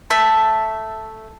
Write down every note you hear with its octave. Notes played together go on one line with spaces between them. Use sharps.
A3 E5 A5